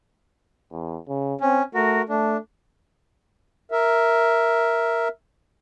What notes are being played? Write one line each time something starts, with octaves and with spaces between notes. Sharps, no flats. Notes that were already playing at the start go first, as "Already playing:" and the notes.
E2
C#3
C4 C#4
A3 F#4 A#4
A3 D4
A#4 E5